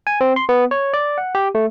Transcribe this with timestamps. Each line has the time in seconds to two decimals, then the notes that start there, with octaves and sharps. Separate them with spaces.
0.07 G#5
0.21 C4
0.36 C6
0.49 B3
0.71 C#5
0.94 D5
1.18 F#5
1.35 G4
1.55 A3